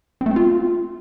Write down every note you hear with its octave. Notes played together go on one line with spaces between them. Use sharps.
C4
A3
C4
F4